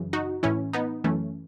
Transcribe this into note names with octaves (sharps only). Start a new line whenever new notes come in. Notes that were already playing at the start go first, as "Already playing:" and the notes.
Already playing: F#2 C#3 E3
D#4 F#4
A2 E3 C#4 E4
B3 D#4
F#2 E3 A3 C#4